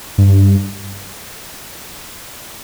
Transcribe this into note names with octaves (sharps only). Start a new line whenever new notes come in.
G2